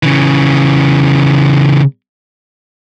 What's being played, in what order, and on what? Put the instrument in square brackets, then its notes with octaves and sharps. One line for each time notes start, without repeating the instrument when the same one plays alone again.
[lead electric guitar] C#3 E3